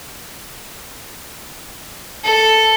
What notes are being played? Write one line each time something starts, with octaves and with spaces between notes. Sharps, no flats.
A4